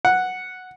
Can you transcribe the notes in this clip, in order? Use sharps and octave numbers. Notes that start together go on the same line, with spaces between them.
F#5